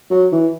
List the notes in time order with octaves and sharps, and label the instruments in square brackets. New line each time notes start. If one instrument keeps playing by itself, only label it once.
[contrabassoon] F#3
E3